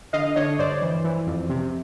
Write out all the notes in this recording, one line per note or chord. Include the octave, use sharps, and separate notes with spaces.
D3 D#5 F5
D3 C#5 D#5
G2 C5 D5
E3
E3
F2
C3